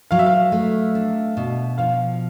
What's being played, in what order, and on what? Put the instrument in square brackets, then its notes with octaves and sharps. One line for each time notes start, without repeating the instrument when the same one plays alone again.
[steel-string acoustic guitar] F#3 [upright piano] F5
[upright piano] E5
F5
[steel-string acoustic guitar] A3
D4
B2
[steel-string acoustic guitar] F3 [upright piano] F5